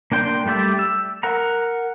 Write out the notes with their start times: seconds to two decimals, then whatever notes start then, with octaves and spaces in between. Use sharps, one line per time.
0.12 A#3 D4 G5 C6 G6
0.46 G3 A3 G4 D5 E5
0.79 E6
1.23 A#4 F#5 A#5